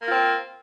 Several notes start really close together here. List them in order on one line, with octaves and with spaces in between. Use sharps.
A#3 F4 C4